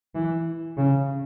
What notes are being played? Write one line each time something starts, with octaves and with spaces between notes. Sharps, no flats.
E3
C#3